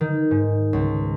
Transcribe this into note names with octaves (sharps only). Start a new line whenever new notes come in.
D#3
G#2
C#2